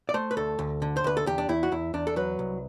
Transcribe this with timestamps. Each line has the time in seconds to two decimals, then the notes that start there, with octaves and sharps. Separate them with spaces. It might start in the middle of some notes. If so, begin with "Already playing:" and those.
0.09 D5
0.14 A3 C5
0.31 B4
0.37 D2 A4
0.59 D2
0.82 D3
0.97 C5
1.04 D2 B4
1.17 A4
1.26 E2 G4
1.38 D4
1.49 E2 E4
1.63 F#4
1.72 E2 E4
1.94 E2 D4
2.07 A4
2.16 F#3 B4
2.39 C2